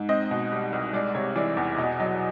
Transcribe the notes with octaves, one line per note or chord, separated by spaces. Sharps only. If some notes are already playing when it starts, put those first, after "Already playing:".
Already playing: G#2
C4 D#5
B2
G3
C2
G#3 D5
C3 C#5
E3 D5
E2
B2 D#5
F#3 D#5